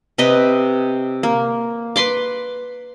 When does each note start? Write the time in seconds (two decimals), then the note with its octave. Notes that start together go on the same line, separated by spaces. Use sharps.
0.18 C3 B4 D#5
1.23 A#3
1.96 B4 B5 C6 D6